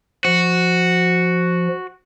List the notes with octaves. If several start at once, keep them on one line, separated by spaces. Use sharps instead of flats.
F3 F#4